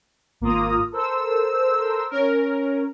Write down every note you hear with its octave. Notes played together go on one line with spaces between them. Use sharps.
G#1 A#3 F4 A#5 D#6
A4 A#4 C5 E6
C#4 A#4